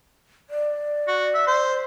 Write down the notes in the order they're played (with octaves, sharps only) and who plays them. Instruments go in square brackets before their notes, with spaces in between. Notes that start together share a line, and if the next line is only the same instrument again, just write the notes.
[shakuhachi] D5
[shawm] F#4
E5
C5